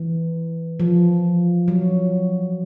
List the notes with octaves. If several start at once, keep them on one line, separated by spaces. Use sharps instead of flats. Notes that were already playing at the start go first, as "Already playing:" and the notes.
Already playing: E3
F3
F#3